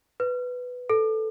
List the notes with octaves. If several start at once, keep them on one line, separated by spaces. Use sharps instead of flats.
B4
A4